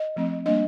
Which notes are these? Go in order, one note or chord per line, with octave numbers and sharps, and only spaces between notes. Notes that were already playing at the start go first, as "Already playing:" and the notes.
Already playing: D#5
F3 A3 C4
G3 A#3 D4 D#5